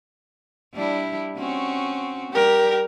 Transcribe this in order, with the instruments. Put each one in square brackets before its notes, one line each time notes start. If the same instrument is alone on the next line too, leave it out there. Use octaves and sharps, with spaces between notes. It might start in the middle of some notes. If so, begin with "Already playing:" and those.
[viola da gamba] G3 D4 E4
C4 C#4 F#4
[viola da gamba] G3 [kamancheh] G4 A#4